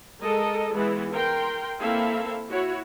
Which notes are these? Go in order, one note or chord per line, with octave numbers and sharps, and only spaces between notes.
G#3 A4 A#4 D#5
E3 G#3 B3 E4
A#4 G5 C6
A#3 C4 E4 A4 E5 F5
E4 F#4 C#5